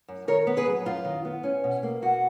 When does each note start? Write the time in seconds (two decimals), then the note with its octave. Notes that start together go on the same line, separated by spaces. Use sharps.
0.08 F#2
0.28 D#3 A#4 C#5
0.47 B3
0.57 G#4 B4
0.66 F#3
0.86 F#2 F4
1.05 D#3
1.25 B3
1.44 C#4
1.64 B2
1.83 A#3
2.02 B2 F#4